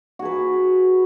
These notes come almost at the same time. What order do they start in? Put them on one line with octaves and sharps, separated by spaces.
F#4 G#4 B4